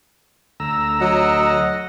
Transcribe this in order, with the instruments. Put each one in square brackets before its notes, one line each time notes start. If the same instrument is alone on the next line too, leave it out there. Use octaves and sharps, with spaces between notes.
[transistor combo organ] D2 A#5 E6
[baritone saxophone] F#3 [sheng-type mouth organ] D#5 F#5